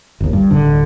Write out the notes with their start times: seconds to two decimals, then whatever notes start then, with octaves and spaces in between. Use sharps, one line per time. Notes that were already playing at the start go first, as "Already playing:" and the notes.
0.20 G1 D#2
0.33 G2
0.50 D1 D3